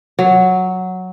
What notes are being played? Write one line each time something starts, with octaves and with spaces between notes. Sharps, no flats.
F#3